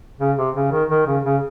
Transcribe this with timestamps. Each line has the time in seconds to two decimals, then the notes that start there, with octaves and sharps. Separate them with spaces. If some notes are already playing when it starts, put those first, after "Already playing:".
0.20 C#3
0.38 C3
0.56 C#3
0.72 D#3
0.90 D#3
1.07 C#3
1.25 C#3